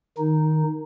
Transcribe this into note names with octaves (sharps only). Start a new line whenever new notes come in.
D#3 D#4